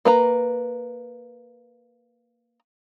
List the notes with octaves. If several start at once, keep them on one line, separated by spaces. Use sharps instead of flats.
A#3 B4 A#5